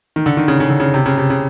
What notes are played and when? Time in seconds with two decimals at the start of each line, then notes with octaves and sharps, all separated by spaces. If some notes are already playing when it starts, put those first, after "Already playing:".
0.16 D#3
0.26 D3
0.37 D#3
0.48 C#3
0.60 C#3
0.70 D3
0.80 C#3
0.94 C3
1.06 C#3
1.18 C3
1.30 C#3